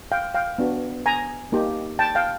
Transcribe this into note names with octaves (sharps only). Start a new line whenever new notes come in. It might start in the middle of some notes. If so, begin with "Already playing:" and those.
F5 G5
F5 G5
B3 D4 F#4
G#5 A#5
A#3 D#4 G4
G5 A5
F5 G5